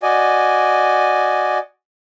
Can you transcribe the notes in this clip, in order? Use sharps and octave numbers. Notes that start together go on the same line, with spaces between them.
F#4 D5 D#5 G#5